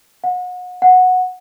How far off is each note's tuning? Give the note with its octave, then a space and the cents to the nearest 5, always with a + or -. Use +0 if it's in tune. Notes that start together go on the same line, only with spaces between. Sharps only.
F#5 -35
F#5 -10